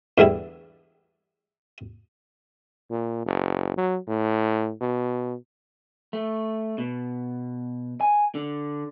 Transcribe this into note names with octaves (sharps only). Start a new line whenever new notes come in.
E2 D3 G3 E4
A#2
F#1
F#3
A2
B2
A3
B2
G#5
D3